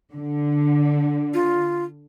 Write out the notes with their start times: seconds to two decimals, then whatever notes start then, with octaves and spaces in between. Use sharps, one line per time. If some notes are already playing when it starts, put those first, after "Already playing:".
0.13 D3
1.34 F4